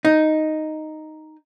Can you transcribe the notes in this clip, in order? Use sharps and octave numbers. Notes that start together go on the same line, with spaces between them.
D#4